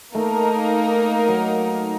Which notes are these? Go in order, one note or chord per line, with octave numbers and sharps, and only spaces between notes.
A3 A#3 D#4 A#4
F#3